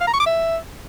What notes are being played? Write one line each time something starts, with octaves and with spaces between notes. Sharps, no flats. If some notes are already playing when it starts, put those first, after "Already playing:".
F5
A#5
C#6
D6
E5